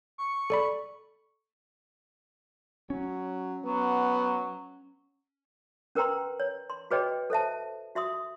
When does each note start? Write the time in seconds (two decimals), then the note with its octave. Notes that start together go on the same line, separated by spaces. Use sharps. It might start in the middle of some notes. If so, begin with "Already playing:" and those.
0.18 C#6
0.50 A4 D5 B5
2.90 F#3 C#4
3.64 F#3 B3
5.95 C#4 A#4 B4 G5 A#5 C6
6.40 C#5
6.70 C6
6.91 F#4 G#4 B4 C#5 D#5 G5
7.30 A4 C5 E5 A5
7.95 F#4 E5 C6 D#6